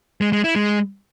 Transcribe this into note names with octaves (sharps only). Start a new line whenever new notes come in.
G#3
G#3
E4
G#3